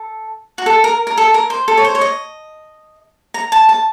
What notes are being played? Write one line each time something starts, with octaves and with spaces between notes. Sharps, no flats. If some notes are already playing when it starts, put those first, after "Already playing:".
Already playing: A4
F#4
A4
A#4
A#4
A4
A#4
C5
A4
C#5
C5
C#5
D#5
A#5
A5
A5